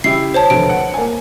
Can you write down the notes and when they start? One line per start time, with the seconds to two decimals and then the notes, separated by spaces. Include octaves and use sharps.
0.04 C#3 E4 G4 C7
0.34 C5 C#5 A5
0.50 F1 D3 D7
0.69 F#5
0.94 A#3 G#5